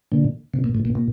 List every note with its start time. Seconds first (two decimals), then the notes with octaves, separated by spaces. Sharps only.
0.12 A#2 D3
0.54 C3
0.64 A#2
0.75 A2
0.85 A#2
0.95 A#2